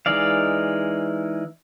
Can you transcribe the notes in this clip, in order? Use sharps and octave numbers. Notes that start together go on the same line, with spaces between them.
E3 G#3 D#4 D5 F5